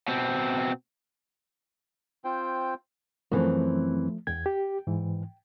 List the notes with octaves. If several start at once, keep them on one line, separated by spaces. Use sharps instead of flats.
B2 C4
C4 F4 C5 G5
F#2 E3 F3 A3 C4
E2 G5 G#6
G4
G#2 E3